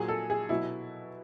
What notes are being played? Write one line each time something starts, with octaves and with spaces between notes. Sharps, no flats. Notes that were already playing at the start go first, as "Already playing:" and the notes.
Already playing: A#2 F#3 G#4
A4
G#4
B2 F#3 E4